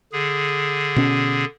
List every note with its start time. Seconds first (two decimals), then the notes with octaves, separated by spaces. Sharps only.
0.12 D3 G#4
0.96 B2 C#4